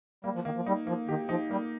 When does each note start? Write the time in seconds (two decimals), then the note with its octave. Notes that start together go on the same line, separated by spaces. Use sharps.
0.24 G3 A#3
0.35 F3
0.45 D#3 A#3
0.56 F3
0.66 G3 D#4
0.87 F3 A#3
1.08 D#3 G4
1.29 F3 D#4
1.50 G3 A#3